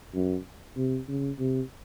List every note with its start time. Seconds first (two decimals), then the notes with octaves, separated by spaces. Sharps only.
0.15 F#2
0.77 C3
1.09 C#3
1.39 C3